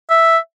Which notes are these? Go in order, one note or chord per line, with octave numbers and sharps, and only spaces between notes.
E5